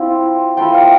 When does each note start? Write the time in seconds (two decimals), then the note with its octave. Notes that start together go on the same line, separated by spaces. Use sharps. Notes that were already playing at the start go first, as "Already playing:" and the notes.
Already playing: F3 C4 E4
0.57 F3 A3 E4 G5
0.74 F5